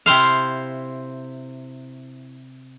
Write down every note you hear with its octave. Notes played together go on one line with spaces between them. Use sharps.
C3 E4 C5 F5